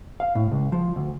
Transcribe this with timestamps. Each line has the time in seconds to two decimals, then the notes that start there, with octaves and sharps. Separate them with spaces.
0.20 F5
0.35 A2
0.52 C#2
0.72 F3
0.96 D2